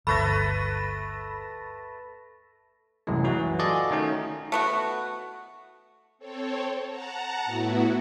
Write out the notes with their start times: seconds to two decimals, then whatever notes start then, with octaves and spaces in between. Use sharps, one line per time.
0.07 G1 D2 A3 B4 E5 B5 A6 A#6
3.07 C2 F#2 A2 E3 G#3
3.25 E3 F#3 F#4
3.59 F4 F#4 G#4 A4 D5 D#5
3.91 D#3 A3 C#4 D#4
4.52 A3 B3 F#4
6.19 C4 A4 C#5
6.88 F#5 A5 A#5
7.45 A2 B3 E4 F#4